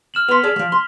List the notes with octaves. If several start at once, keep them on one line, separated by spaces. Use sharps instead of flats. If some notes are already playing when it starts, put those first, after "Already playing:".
F6 E7 F#7
B3 C6 B6 F7
G#4 A4 D5
F3 F#3
C6